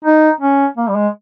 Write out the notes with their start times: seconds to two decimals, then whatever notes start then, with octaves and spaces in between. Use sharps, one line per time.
0.05 D#4
0.41 C#4
0.77 A#3
0.88 G3
0.95 G#3